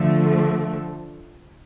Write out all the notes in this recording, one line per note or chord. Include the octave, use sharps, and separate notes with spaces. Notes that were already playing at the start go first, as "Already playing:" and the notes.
Already playing: D3 F3 A3